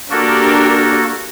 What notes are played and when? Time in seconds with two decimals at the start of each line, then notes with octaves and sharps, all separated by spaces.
0.11 A#3 D4 F#4 G4 A4 A#4